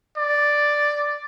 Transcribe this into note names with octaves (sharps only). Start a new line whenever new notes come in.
D5